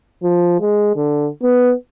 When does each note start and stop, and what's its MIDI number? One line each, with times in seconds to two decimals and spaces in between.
0.23 0.59 53
0.61 0.96 56
0.96 1.28 50
1.43 1.73 59